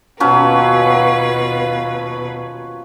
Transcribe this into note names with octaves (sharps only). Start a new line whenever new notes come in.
D#2 B2 F3 F#3 C#4 B4